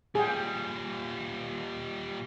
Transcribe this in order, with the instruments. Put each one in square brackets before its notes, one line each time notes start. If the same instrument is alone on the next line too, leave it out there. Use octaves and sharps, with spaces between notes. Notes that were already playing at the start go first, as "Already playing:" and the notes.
[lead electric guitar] A#2 G3 [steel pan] G#4 G5